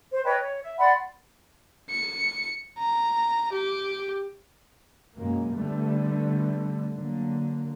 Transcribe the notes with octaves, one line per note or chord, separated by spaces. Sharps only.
C5
B4 C#5 D#5 G5
C#5
E5
D5 F#5 B5 C6
C#7
A#5
G4
F#2 B2 G#3 A#3
D3 G3 A3 B3
D3 F#3 A#3